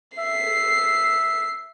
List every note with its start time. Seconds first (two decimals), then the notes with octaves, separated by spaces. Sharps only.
0.18 E5 C7